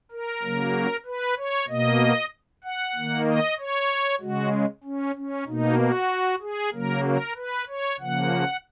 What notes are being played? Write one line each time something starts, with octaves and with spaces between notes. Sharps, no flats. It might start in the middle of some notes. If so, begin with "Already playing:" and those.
A#4
C#3 F#3 A#3
B4
C#5
B2 A#3 D#5
F#5
D#3 A#3
D#5
C#5
C#3 G#3 F#4
C#4
C#4
B2 A#3 D#4
F#4
G#4
C#3 F#3 A#3 A#4
A#4
B4
C#5
C#3 F3 A#3 F#5